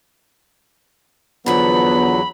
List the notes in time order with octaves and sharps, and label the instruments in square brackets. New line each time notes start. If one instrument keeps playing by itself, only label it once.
[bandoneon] E2 F#3 [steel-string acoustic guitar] D3 F3 A4 [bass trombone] B3 [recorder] B5